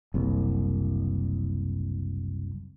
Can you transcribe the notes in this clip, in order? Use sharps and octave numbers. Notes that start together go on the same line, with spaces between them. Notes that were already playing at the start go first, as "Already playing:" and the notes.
F#1 C2